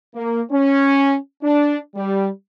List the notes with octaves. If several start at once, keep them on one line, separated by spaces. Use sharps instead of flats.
A#3
C#4
D4
G3